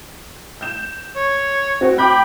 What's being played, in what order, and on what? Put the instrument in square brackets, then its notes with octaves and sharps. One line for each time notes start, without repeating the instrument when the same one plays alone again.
[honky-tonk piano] G6 E7
[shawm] C#5
[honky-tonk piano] C4 F#4
[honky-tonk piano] G5 D6 G6 [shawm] B5